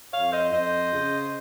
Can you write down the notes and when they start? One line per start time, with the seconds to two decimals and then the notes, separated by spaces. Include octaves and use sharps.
0.12 F2 C#5 F5
0.31 C5 D#5
0.52 F2 C5 D#5
0.92 C#3